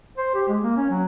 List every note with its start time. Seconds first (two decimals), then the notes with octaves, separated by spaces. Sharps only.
0.18 C5
0.35 G4
0.48 G#3
0.63 A#3
0.77 C#4
0.90 F#3